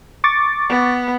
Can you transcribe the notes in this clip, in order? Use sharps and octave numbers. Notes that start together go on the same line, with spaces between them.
C#6 D6 A6
B3